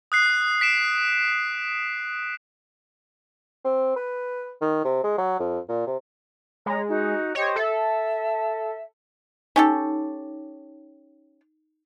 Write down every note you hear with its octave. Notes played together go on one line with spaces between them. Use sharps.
D#6 F#6 C7
B6 D7 E7
C4
B4
D#3
C3
G#3
F#3
F2
A#2
C3
G#3 C#5 A#5
D#4 F#4
G4 C5 C#5 D#5
A4 E5
C#4 D#4 G4 A4